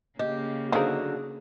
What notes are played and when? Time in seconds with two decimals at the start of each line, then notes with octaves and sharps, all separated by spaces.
0.19 C#3 A#3 G4 D#5
0.72 D3 F#3 D#4 G#4 A#4 C5 F5